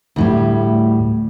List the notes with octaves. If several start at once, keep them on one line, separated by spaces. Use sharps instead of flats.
D2 A2 G3